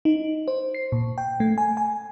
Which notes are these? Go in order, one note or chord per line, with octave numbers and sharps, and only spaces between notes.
D#4
C5
C7
A#2
G5
A3
G#5
G#5